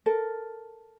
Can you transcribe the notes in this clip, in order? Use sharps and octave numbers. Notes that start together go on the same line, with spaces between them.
A4 A#4